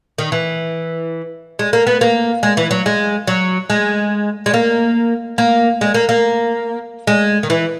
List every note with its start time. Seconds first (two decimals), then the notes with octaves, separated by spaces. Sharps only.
0.18 D#3
0.32 E3
1.59 G#3
1.73 A#3
1.87 B3
2.01 A#3
2.43 G#3
2.57 E3
2.71 F#3
2.86 G#3
3.27 F#3
3.70 G#3
4.46 G#3
4.54 A#3
5.38 A#3
5.81 G#3
5.94 A#3
6.09 A#3
7.07 G#3
7.43 D#3
7.50 E3